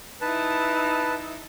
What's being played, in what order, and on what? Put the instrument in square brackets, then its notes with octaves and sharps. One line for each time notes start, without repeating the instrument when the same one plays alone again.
[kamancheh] D#4 E4 [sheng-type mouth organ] B4 A5